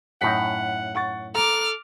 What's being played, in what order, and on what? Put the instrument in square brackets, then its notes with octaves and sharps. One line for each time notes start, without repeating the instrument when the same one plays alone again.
[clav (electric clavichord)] F#2 A2 D#4 [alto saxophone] F#5 [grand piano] B6
[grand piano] F#5 C#6 A6
[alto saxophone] A4 [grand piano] A#5 [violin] D6 F6